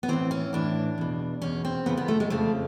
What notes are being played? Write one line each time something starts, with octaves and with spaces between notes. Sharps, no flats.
B3
A2 E3 C4
C#4
A2 E3 D4
E2 B2
E2 B2 C#4
C4
F2 C#3 F3 B3
B3
A3
G#3
F2 C#3 F3 A3